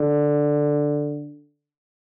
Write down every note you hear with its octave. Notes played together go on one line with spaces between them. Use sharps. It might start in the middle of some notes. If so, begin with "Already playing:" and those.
Already playing: D3